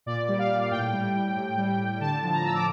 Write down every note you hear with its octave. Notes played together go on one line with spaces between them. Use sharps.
A#2 D5
G3
F5
A#2
A2 G5
G3
A2
A2
G3
A2
D3 A5
F3
A#5
D3 E6
D6